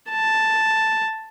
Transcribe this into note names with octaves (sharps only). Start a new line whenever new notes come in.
A5